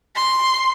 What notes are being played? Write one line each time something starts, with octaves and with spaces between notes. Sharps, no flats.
C6